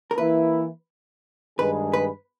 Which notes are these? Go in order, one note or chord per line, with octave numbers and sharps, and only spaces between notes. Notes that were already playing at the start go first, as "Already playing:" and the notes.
A#4
E3 A#3 E4 B4
G2 D#3 G#3 D#4 G#4 B4
B4